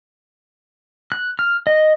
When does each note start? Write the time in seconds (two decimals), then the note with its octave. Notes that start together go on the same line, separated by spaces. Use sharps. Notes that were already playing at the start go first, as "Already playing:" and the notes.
1.12 F#6
1.39 F6
1.67 D#5